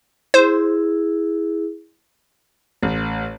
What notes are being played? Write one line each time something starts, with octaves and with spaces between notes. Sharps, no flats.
E4 G#4 C5
A1